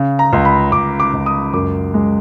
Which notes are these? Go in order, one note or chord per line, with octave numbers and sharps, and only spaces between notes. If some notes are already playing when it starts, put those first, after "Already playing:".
Already playing: C#3
A#5
C#2
B5
C#2 D6
D6
C#2
D#6
F#2 D6
G#3